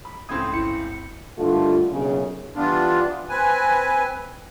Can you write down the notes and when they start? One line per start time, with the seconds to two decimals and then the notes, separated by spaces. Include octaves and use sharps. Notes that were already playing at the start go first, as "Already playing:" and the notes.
0.05 B5
0.29 C#2 A2 C4 D#6 G#6
0.53 G1 E4 C#7
1.39 G2 D3 D#3 A3 F4
1.91 B1 F#2 A#2 C#3
2.56 E3 G3 B3 D4 F4
3.29 C4 B4 G#5